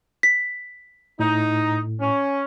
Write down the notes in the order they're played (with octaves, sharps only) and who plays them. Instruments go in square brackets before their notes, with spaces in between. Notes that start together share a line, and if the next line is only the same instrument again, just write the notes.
[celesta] B6
[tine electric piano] A2 [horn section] D#4
[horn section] C#4